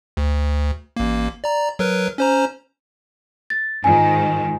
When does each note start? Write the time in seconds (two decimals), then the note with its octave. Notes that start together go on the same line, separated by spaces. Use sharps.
0.17 D2
0.96 A1 A#3
1.44 D5 A#5
1.79 F#3 A#4 B4
2.18 C#4 C5 A#5
3.50 A6
3.84 G#2 D#3 F4 G#5